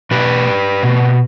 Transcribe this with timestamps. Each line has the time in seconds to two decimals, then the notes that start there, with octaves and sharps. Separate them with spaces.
0.11 B2 G4 B4
0.83 B2